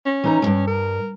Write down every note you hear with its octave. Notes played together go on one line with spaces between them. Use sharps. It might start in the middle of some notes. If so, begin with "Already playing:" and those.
C#4
E3 D#4 A#5
D2 G2
A#4